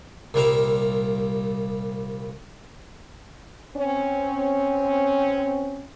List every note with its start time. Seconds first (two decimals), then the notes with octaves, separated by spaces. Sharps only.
0.34 C2 A#2 G3 A#4 E5 F5
3.76 C4 C#4